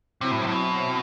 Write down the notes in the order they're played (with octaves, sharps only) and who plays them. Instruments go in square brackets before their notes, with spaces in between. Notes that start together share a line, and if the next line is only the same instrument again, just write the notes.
[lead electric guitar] C3 [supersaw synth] F#3 C4 E4
[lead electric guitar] A2
C3
A2
B2